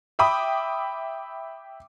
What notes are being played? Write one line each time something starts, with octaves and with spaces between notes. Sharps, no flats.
E5 G5 B5 D6 D#6